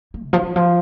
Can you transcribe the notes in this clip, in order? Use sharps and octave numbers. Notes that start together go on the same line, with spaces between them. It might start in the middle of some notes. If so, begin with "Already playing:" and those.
A#3
C3
F3
D#3
F3